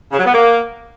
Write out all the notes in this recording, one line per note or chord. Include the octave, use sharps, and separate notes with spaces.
C#3
F#3
B3
A#3